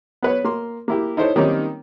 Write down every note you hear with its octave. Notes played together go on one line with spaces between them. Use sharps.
B3 B4 C#5
A#3 C6
A#3 E4 G4
D#4 E4 A4 C5 C#5
D#3 G3 A#3 C4 C#4 D#4